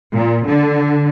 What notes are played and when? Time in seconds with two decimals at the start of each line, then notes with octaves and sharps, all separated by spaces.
0.12 A#2
0.45 D3